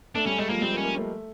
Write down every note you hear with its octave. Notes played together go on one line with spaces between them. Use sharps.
A3 D4
G3 C#4
G#3 A3
F3 A#3
G3 C4
A#3
C#4
A#3
A3